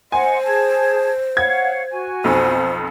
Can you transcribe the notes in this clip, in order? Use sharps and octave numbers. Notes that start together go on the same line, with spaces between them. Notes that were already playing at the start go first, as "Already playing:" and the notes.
C5 D#5 F#5 G#5 C6
G#4 A5 G#6
C#5 F5 F#5 G#6
F#4 G#5
B1 F2 C5